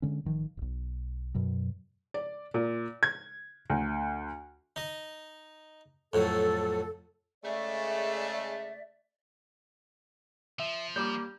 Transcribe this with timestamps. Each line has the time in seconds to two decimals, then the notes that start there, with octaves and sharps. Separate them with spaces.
0.02 D3 G#3 C#4
0.25 A1 D#3 F3
0.57 D1 B1
1.35 F#2 B2 F#3
2.14 D5
2.54 A#2
3.03 G#6
3.70 D2
4.76 D#4 D#5
6.13 F2 A2 F#3 A4
7.44 C#3 G#3 A3 D5 E5
10.60 F3 E5
10.96 G3 A#3 D6 G6